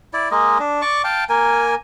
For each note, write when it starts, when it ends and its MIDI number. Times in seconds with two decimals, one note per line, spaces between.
0.13 0.29 64
0.13 0.29 74
0.31 0.58 56
0.31 0.58 58
0.31 0.58 75
0.59 0.82 62
0.82 1.02 74
0.82 1.02 85
0.82 1.02 86
1.04 1.24 77
1.04 1.24 79
1.04 1.24 81
1.29 1.75 58
1.29 1.75 70
1.29 1.75 80